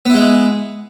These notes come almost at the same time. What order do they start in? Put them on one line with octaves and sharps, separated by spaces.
B3 E4 G#3